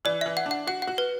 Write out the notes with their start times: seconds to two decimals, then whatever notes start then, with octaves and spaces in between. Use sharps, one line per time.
0.05 E3 D5
0.21 E3 E5
0.37 F#5
0.46 D4
0.51 F#5
0.67 F#4 F#5
0.82 F#5
0.87 F#4
0.98 B4